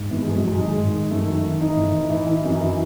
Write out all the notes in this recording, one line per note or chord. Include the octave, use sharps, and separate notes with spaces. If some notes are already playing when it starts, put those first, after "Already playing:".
Already playing: G#2
E3 B3
G#3
A2
F#3
A2 G#3
D#3 G#3
G#2
D#3
F#2 A3
D#3
D#3
E3 D#4
A2
E3
E3
E3
F#2
E3